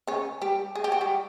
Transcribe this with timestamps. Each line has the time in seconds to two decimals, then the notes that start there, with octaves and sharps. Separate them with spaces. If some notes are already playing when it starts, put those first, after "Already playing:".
0.07 C#3 C#4
0.42 G3 G4
0.75 G#4
0.84 G4
0.92 F#4
1.01 G3 G4